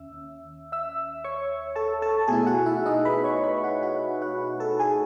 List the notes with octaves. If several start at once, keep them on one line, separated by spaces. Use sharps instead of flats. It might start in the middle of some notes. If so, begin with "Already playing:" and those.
Already playing: D#2 C#4 E5 E6
E5 E6
C#5 C#6
A4 A5
A4 A5
B2 A3 E4 G#4 G#5
F#4 F#5
E4 E5
D#4 D#5
B4 B5
C#5 C#6
B4 B5
F#4 F#5
F#4 F#5
F#4 F#5
A4 A5
G#4 G#5